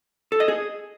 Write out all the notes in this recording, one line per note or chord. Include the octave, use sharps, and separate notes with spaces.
A4
D#5
G#4